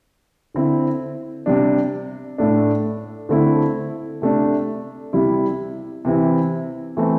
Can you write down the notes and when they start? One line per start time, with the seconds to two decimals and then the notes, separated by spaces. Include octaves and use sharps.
0.54 D3 C4 E4
1.46 C3 G3 D4
2.38 A2 A3 D4
3.29 D3 A3 C4 E4
4.22 C3 A3 D4
5.13 C3 G3 E4
6.05 C3 E3 C4 E4
6.97 E3 A3 C4